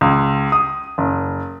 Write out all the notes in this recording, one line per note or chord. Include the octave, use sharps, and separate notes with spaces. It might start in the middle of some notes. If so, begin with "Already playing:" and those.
C#2
D#6
F#1